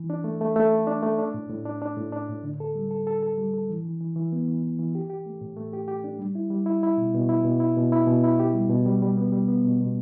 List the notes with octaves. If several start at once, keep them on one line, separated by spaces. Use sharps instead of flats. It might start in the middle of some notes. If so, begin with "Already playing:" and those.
Already playing: E3
D4
A3
A3
A3
A4
D4
A3
D4
A2
A2
D4
D4
A2
D4
A2
D3
A4
G3
A4
A4
A4
G3
A4
E3
E3
E3
E3
B3
E3
E3
E3
G4
G4
A3
A2
A3
G4
G4
D4
G3
E4
G3
E4
E4
B2
B2
E4
B2
E4
B2
E4
B2
E4
G4
G3
B2
G3
G3
B3
G3
B3
B2
B2